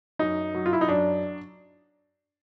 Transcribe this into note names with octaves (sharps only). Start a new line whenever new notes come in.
F#2 D#4
F#3
F4
E4
D#4
F#2 D4